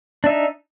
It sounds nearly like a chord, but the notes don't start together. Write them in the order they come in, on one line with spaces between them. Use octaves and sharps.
D4 E5 D#4